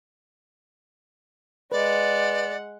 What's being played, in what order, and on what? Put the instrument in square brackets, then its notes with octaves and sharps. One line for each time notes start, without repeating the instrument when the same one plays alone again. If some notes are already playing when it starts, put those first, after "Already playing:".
[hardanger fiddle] G#3 F#5 [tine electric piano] B4 [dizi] D5